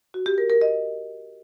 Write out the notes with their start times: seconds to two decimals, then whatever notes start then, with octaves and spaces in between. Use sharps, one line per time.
0.14 F#4
0.26 G4
0.38 A#4
0.50 A#4
0.61 D#5